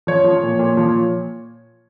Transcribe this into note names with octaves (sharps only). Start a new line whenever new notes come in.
F3 C#5
F3
A#2
A#2
F3